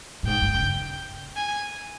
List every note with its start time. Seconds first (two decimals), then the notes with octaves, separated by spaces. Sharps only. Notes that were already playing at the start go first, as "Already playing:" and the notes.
0.23 A2
0.27 G#2 G5
0.42 G2
0.54 C#3
1.36 G#5